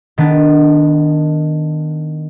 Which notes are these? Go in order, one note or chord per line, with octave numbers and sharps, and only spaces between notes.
D#3 B3 D4